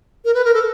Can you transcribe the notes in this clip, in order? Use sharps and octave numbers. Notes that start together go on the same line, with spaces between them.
A#4
B4
A#4
A4